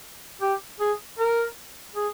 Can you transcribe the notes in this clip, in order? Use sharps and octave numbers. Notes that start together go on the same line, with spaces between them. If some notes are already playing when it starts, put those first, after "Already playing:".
G4
G#4
A#4
G#4